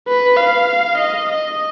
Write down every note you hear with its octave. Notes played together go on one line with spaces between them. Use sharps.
B4
F5
D#5
D#5